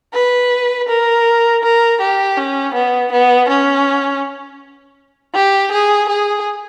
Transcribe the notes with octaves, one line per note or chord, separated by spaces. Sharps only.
B4
A#4
A#4
G4
C#4
B3
B3
C#4
G4
G#4
G#4